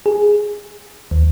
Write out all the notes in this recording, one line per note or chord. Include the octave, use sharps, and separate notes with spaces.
G#4
D#2